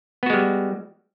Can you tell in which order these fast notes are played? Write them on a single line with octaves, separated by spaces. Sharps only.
B3 F#4 G#3 G3